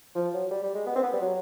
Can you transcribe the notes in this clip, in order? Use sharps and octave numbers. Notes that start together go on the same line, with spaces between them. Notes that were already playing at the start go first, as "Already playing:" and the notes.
F3
F#3
G3
G3
G#3
B3
C4
B3
G3
F#3